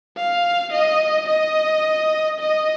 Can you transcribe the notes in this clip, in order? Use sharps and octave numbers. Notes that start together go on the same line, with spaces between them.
F5
D#5
D#5
D#5